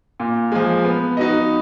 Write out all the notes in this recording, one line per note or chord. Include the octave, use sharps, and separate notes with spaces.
A#2
F3 G#3
B3
D#4 F#4 B4 D#5